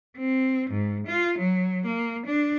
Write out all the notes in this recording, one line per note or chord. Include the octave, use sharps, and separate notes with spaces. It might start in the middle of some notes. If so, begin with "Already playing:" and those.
C4
G#2
F4
F#3
A#3
D4